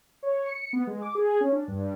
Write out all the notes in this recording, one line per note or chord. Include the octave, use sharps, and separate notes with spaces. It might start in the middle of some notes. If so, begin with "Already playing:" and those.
C#5
C#7
B3
G#3
D6
G#4
C#4
D4
G2